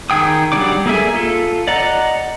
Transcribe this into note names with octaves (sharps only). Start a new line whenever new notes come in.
D#3 G#4 G5 D#6
F#3 G3 D4 D5 D6
A#3 G#4 A4 E5 G#5
F4 A4
D5 D#5 F#5 A#5